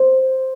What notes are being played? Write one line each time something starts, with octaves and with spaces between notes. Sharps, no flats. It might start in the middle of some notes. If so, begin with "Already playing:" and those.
Already playing: C5